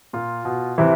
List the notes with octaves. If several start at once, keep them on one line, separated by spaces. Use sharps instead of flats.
A#2 F4
B2
C3 E3 E4